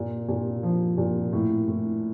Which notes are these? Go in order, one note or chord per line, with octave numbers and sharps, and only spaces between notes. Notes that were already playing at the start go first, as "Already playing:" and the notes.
Already playing: A#2
A#2
F3
A#2
A2
A2